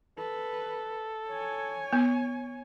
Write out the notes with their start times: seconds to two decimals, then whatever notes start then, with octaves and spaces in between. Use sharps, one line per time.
0.18 A4 B4
1.29 C#5 G#5
1.93 B3